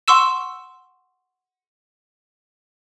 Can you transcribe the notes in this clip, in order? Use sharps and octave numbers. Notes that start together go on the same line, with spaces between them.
F#5 C6 C#6 E6 E7